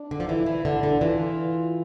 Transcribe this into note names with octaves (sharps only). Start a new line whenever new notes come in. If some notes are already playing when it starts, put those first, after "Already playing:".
Already playing: D4
D3
F3
E3 E4
E3
D3 D4
D3
E3 F4